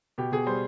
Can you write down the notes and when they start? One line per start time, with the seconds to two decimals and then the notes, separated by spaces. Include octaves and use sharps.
0.18 B2 G4
0.32 B2 G#4
0.46 G3 C5